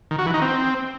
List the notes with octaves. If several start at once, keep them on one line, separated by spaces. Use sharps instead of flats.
D#3
F#4
E3
D#4
C4